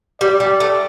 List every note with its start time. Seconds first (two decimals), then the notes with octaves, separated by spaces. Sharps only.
0.21 G3 D5
0.40 G3
0.60 A3